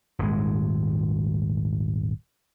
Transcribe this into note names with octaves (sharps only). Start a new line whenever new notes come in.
D#1 G#1 G#3